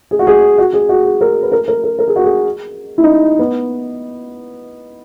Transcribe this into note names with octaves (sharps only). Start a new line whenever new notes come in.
G#4
F#4
G#4
F#4
G#4
F#4
G#4
A#4
B4
A#4
A#4
A#4
A#4
G#4
F#4
G#4
E4
D#4
B3